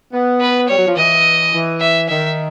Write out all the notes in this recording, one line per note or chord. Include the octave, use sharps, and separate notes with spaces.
B3
B4
G3 C#5
F#3
F3
E3 D#5
E3
E5
D#3 E5